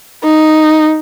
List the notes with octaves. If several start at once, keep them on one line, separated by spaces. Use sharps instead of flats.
D#4